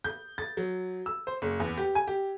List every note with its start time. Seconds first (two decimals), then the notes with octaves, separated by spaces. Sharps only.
0.04 G6
0.38 A6
0.57 F#3
1.06 E6
1.27 C5
1.42 F#1
1.60 E2
1.78 G4
1.95 G#5
2.08 G4